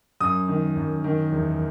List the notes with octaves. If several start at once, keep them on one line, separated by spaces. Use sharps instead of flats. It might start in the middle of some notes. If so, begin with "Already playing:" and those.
F#2 D#6
D#3
F#2
D#3
E2